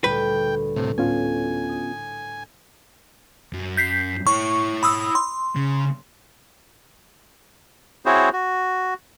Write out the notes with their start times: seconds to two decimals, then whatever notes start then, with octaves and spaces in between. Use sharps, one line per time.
0.04 D2 A#2 G3 B4 G5
0.76 A2 C3
0.98 A2 B3 C#4 F4 G#5
1.69 D#6 D#7
3.53 F#2
3.77 G6 B6 C7
4.27 E4 C#5 C#6
4.83 B5 D#6 E6
5.15 C6
5.56 C#3
8.06 C4 E4 F#4 G#4 C5 C#5
8.33 F#4